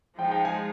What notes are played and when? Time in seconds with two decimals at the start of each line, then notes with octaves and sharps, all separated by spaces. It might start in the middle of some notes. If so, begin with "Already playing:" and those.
0.19 F3 G#3 D#4 G5
0.31 G5
0.45 G#5